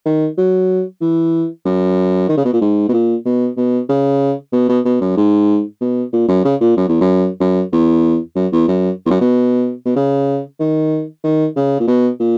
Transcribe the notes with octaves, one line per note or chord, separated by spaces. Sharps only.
D#3
F#3
E3
F#2
D#3
C#3
B2
A#2
G#2
B2
A#2
B2
B2
C#3
B2
B2
B2
F#2
G#2
B2
A#2
F#2
C#3
A#2
F#2
E2
F#2
F#2
E2
F#2
E2
F#2
E2
F#2
B2
B2
C#3
D#3
D#3
C#3
A#2
B2
A#2